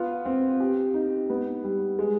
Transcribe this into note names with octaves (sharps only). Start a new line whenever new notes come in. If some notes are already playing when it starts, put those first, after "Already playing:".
Already playing: B3 F4
C4
G4
D#4
B3
G3
G#3